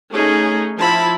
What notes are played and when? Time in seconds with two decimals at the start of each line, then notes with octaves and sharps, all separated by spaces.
0.14 A3 C#4 D#4 G#4
0.79 F3 E4 A5 B5